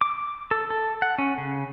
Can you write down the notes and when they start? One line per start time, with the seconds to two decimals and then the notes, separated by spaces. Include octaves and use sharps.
0.01 D6
0.51 A4
0.70 A4
1.02 F#5
1.18 C#4
1.38 C#3